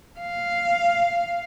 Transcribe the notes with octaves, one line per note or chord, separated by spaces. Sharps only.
F5